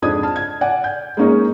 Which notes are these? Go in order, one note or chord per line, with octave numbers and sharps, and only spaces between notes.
F2 G#2 D4 D#5 D#6 G#6
A5 F6
G#6
D5 F#5 G#5
G6
G#3 A#3 C#4 D#4 G#4